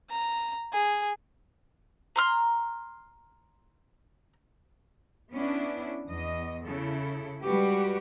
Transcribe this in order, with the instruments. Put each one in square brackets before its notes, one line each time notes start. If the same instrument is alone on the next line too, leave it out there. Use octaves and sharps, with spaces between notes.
[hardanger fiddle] A#5
G#4
[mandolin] A#5 C6 F6
[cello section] B3 C#4 D4 E4
E2 D#5
C#3 E4 A4
G3 G#3 F#4 G4 B4